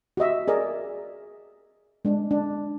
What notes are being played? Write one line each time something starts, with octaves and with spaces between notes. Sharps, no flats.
F#4 G4 D#5 E5
G#4 A#4 D5 D#5
G#3 D4
D4